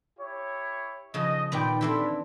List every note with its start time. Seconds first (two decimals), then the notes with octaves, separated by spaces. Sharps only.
0.19 E4 G4 C#5
1.14 C#3 F3 D#5
1.52 A#2 D#3 B3 D5 G5
1.81 E3 C4 D4 E4 G4 A4